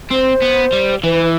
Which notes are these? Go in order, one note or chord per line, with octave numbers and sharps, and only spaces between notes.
C4 C5
B3
G3
E3 B4